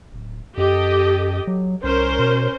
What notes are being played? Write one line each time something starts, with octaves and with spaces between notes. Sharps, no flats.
D1
F#2 G4 A4 D#5
F#3
C2 C#4 A#4 C5
B2